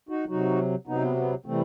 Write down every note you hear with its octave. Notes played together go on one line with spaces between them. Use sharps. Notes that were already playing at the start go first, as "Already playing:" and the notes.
D#4 F#4
C3 F#3 D#4 F#4
C3 F#3 B3 D#4
B3
B3
C3 E3 G3 A3 C4